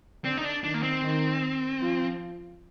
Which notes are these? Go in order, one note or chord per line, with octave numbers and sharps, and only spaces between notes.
D3 C4 D4
D#4
D4
D#3 D4 D#4
A#3
C4
D#3 D#4
F3 F4